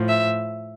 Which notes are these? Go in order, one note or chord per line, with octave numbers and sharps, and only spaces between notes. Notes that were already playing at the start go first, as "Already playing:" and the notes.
Already playing: A2 F3
E5